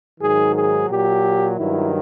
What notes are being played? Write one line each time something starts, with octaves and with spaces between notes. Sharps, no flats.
G#2 D#3 F#3 G#4
G#4
A#2 F#3 G4
G2 D#3 F#3 E4